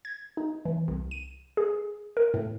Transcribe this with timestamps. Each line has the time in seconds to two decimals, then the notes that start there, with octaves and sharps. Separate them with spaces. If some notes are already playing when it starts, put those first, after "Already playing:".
0.05 G#6
0.37 D#4
0.65 E3
0.88 C2
1.11 D#7
1.57 G#4
2.17 A#4
2.34 A2